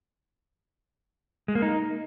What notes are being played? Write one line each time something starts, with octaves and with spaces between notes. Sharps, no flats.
G#3
A#3
D#4